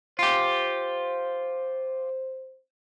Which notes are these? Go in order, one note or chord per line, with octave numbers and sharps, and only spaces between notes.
F4 G4 C5